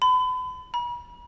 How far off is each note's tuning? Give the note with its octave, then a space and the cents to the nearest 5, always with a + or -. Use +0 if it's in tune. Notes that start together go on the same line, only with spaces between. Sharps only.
B5 +40
B5 -40